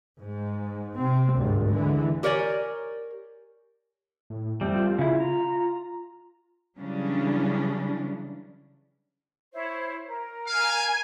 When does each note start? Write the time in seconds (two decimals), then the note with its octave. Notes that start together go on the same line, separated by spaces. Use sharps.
0.20 G#2
0.99 C3 C4
1.36 G#1 D2 G2
1.70 D3 E3 G#3
2.23 G4 A#4 C#5 D5 G#5
4.30 A2
4.61 F2 G3 A3 C4
4.75 F4
4.99 C#3 E4
5.20 A#5
6.78 C#3 E3 F#3 G3 C#4 D4
9.52 E4 C5 C#5
10.06 A#4
10.46 F5 G#5